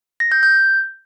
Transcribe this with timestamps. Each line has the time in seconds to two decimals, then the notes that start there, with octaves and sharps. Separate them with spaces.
0.20 A#6
0.32 G6
0.43 G6